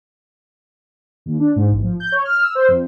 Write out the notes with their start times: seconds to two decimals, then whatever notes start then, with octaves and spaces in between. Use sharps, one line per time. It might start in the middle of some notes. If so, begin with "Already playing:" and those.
1.26 D#2
1.40 D4
1.56 G#2
1.71 A1
1.84 F3
2.00 G6
2.12 C#5
2.25 F6
2.43 E6
2.55 C5
2.68 F2